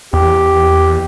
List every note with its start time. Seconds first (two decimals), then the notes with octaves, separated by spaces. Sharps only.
0.13 E2 G4